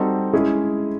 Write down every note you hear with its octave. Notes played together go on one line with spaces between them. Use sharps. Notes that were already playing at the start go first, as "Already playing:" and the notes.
Already playing: G3 C4 D#4 F#4 A4
G#3 C#4 E4 G#4